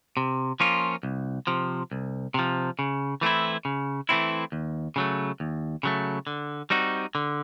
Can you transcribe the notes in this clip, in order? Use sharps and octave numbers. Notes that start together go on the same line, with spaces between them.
C3
F3 A#3 C#4 F4
C2
C3 F3
C2
C3 F3
C#3
E3 A3 C4 E4
C#3
E3 A3 C4 E4
D#2
C#3 F#3 A3
D#2
C#3 F#3 A3
D3
G3 C4 D#4 F#4
D3